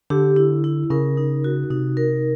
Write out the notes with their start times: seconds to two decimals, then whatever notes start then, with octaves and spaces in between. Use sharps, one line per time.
0.10 D3 G4
0.36 E4
0.64 E4
0.90 C#3 A#4
1.17 D#4
1.44 F#4
1.70 C3 D#4
1.97 A#4